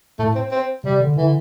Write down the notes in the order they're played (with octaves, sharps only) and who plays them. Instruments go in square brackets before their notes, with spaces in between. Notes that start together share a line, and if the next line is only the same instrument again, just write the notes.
[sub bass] A2 [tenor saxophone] A3
[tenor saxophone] C4
C4
[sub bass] C3 [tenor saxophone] G3
[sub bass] D3
[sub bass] D3 [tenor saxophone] E3